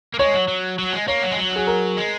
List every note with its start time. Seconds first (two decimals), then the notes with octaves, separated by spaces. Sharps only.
0.14 A#3
0.19 G#3 C#5
0.34 F#3
0.48 F#3
0.79 F#3
0.93 G#3
1.08 A#3 C#5
1.23 F#3
1.31 G#3
1.38 F#3
1.56 G#4
1.67 A#4
1.97 G#3